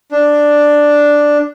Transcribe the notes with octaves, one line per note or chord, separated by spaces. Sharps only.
D4